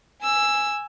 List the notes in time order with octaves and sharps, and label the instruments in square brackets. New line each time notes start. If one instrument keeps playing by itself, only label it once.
[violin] G#5 E6